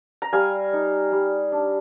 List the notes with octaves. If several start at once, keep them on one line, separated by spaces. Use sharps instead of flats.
A#5
G3 F5 G#5
D#4
G3
D4